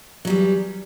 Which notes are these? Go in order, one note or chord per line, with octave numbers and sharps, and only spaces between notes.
E2 F#3 G3